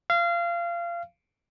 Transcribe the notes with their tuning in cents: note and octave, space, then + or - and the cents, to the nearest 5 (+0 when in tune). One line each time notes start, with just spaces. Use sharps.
F5 -25